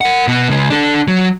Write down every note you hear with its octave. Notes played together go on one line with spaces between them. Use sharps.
A#4 F#5
B2 B3
C#3 G#3
D4 A4
F#3